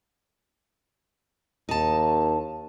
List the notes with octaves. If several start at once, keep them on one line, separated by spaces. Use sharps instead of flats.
D#2 D#4 A5